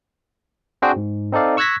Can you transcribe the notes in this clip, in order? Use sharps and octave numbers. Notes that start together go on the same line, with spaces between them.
C4 D4 F#4 G#4 C5 G5
G#2
C4 D#4 A4 D5 F5
C#6 E6 F#6 G#6 A#6 B6